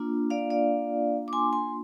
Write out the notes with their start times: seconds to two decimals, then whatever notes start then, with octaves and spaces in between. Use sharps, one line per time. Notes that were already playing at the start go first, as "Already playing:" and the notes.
Already playing: A#3 D4 F4
0.30 D5 F5
0.50 D5 F5
1.28 D6
1.33 G#5 C6
1.53 G#5 C6